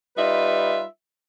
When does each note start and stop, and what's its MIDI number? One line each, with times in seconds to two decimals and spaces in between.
0.17 0.84 55
0.17 0.84 63
0.17 0.84 65
0.17 0.84 71
0.17 0.84 76